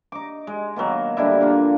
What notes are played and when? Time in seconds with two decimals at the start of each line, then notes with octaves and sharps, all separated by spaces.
0.12 D#4 D6
0.47 G#3
0.76 D#3 F#3 A#3 B3
1.17 D3 G3 D4 E4
1.41 F3 A#3